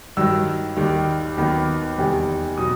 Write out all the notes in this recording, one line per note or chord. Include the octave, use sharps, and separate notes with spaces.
G2 D#3 F#3 E6
D#2 D#3 G3
D#2 D#3 F#3 B3
E2 C3 D#3 G3
B2 F#3 D#6